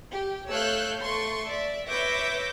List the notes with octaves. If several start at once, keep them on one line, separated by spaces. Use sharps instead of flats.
G4
A3 C#5 F5 E6 F#6 G6
A3 C6 C#6
D5 E5
B4 C#5 E5 D6 G6 A#6